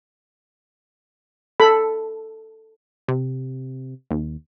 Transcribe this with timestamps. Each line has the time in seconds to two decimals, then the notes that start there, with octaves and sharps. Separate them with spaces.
1.60 A4 B5
3.08 C3
4.11 D#2